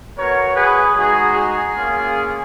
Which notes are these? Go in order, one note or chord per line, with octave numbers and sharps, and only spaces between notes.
B3 F#4 A#4 C#5
G#4 B4
G#3 D#4 F#4 G#4
G#4
A#3 C#4 F4